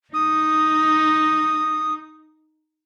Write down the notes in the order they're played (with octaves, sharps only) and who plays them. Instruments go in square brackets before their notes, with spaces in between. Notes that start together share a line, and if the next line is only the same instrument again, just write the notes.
[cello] D#4 [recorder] D#6